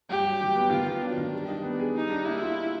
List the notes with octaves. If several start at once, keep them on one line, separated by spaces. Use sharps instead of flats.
G2 G4
F#3
D#3
B3
D#3 F4
B3
F#3 D4
D#3
G3
D#4
B3
G#4
G3 D#4
D4
A#3 E4
F4